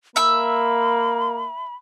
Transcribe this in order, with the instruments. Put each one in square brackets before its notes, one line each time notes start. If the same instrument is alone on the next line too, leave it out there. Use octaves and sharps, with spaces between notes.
[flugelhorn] A#3 [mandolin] E5 E6 [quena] B5